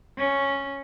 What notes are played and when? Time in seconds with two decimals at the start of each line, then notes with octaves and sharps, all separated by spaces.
0.17 C#4